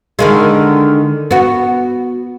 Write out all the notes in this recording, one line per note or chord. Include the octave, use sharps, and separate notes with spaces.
D3 D#3 G#3
B3 F#4